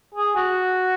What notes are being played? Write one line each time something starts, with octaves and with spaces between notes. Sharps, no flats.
G#4
F#4